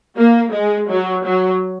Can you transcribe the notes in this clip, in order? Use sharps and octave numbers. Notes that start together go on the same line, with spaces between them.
A#3
G#3
F#3
F#3